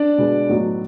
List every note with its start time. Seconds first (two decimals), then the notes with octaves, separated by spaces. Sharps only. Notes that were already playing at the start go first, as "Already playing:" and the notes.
Already playing: D4 D5
0.18 B2 G#3 B3
0.50 A2 F#3 B3 D#4 F#4